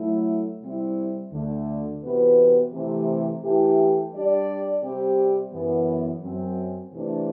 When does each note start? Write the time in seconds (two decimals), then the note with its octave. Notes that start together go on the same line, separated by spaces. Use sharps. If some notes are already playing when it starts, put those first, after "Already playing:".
Already playing: F#3 A3 E4
0.61 C3 G3 C4 E4
1.32 D2 D3 A3
2.02 C3 E3 B3 F#4 B4
2.72 C3 E3 A3
3.42 E3 A3 E4 G4
4.12 G3 D4 G4 D5
4.82 C3 G3 C4 G4
5.52 F#2 E3 B3
6.22 F#2 F#3 C4
6.92 C3 E3 A3 D4